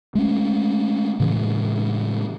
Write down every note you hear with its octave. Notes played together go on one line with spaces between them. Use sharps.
G#3 A3 C#4
A2 C#3 E3 G#3